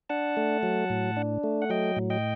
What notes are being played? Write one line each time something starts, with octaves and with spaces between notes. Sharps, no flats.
D4 F#5 A5
A3
F#3
A2
D4
A3
F#5
F#3 D#5 G5
A2
D#5 G5